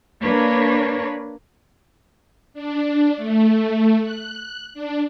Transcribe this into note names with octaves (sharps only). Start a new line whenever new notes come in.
A#3 D4 B4 C#5
D4
A3
F#6
D4